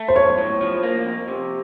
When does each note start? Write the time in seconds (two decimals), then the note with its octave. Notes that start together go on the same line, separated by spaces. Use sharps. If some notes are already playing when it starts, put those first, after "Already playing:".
Already playing: A3
0.08 C5
0.16 B1 C#5
0.38 A2
0.61 F3
0.83 A#3
1.06 F2
1.28 C3